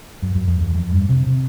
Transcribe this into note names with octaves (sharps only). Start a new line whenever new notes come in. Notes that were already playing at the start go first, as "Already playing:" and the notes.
F#2
F#2
F2
E2
F2
G2
C3
C3